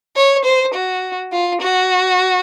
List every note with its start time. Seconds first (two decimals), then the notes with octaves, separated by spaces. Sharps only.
0.16 C#5
0.45 C5
0.74 F#4
1.32 F4
1.61 F#4